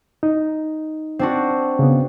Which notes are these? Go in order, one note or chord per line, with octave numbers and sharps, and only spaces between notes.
D#4
C4 D4 F#4
C#3 B3